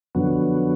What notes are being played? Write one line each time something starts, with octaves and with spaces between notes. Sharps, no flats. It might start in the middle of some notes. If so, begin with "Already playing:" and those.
F2 D3 F#3 B3